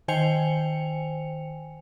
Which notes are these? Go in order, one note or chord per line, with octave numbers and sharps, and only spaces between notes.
D#3 C5 G5 G#5 C#7 F7